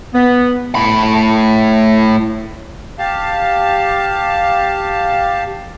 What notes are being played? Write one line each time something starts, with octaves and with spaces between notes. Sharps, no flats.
B3
A2 B5
G4 F5 A5